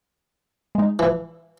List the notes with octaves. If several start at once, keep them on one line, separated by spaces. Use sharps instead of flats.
G#3 D#4
E3